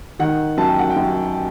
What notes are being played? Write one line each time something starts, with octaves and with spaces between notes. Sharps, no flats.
D#3 F#5
F#2 A5
G5
F#5
G5
F#2